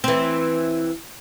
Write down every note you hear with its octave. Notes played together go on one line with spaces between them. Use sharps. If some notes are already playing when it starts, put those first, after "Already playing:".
E3 C4